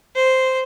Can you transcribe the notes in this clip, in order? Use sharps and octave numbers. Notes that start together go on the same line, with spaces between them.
C5